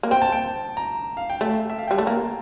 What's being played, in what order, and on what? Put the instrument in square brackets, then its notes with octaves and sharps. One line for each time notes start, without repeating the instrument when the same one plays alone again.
[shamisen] A#3
[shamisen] C4 [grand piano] G5
[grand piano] A5
G5
A#5
F5
G5
[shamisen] A3 [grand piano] A5
[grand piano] E5
F5
[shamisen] G3 [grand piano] G5
[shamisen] A3 [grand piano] A5
[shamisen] A#3 [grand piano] A#5